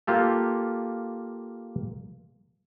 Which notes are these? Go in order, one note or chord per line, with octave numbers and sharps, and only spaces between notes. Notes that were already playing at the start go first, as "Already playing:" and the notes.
A#3 F4 G4 A4